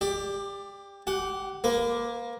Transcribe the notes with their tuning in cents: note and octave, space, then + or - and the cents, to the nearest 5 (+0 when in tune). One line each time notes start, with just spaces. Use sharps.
G4 +20 D5 +0
G4 -20 F#5 +15
A#3 +15 B4 +45